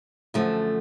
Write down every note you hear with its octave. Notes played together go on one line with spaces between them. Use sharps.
F#2 D3 F3 A3